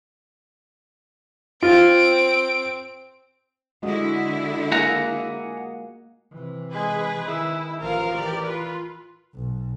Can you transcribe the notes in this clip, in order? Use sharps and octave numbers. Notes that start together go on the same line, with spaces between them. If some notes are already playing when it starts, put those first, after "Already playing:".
C4 F4 D7
D3 G#3 E4 F#4 D#5
A#3 G#4 F#5 A#5
C3 E3
G#3 G#4 B4
D#3 E4
A1 F3 A#4 F5
E3 G4 D5
F4 B4
B1